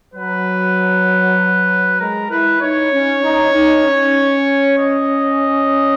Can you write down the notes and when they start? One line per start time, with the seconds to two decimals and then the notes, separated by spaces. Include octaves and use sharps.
0.14 F#3 B4
1.99 G#3 A#4
2.30 E4 B4
2.61 D#4 C#5
2.92 C#4
3.23 D#4
3.54 D#4
3.85 C#4
4.78 D#5